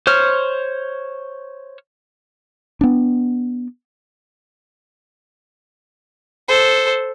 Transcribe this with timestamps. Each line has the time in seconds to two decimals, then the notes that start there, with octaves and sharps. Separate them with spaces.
0.07 C5 C#5 F6
2.81 B3 D4
6.48 A4 C5